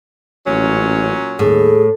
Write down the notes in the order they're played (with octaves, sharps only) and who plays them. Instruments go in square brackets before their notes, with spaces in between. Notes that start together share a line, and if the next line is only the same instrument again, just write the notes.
[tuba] A1 [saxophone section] A#2 F#3 C#4
[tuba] D#2 [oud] A2 [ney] G#4